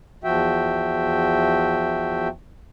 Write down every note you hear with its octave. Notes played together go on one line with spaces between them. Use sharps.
E2 F3 F#4 E5 G5